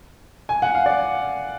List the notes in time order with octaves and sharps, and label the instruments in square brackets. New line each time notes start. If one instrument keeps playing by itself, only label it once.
[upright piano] G#5
F#5
F5
D5